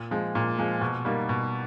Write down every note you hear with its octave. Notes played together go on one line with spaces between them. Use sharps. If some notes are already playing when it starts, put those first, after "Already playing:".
Already playing: A#2
F3 G#3
A#2
F3 G#3
B2
G3 A#3 D#4
B2